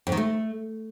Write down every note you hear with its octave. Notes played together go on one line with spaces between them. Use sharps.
F2
D#3
A3